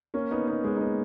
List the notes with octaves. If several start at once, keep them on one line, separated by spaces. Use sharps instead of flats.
A#3 C#4
B3 D#4
B3 D#4
G#3 B3
D#4
A#3 C#4